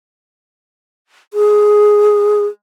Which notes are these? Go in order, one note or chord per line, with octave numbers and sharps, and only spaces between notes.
G#4